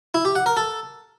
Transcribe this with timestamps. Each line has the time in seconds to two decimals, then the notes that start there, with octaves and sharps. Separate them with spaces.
0.14 E4
0.25 G4
0.36 F#5
0.46 A#4
0.57 A4